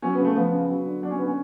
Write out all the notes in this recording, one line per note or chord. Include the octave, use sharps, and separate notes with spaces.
F#3 C#4
B3
C#3 A3
F3 B3
C#3
F#3
D3
F#3 D4
C#4
D3 B3
C#4